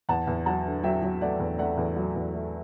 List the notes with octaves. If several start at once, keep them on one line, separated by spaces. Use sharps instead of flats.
E2 F#5 A5
E2
F#3 F#5 A5
D3
F#3 E5 G5
F#3
A3 D5 F#5
E2
A3 D5 F#5
E2
F#3
E2
A3